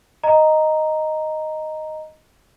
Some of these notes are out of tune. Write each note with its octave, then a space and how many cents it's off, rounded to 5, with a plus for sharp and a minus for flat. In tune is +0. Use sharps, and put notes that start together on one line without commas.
D#5 +0 A#5 +0